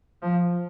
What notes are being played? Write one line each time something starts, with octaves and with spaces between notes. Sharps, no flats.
F3